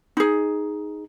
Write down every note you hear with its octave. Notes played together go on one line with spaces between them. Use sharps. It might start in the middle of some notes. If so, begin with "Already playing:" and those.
D#4 G#4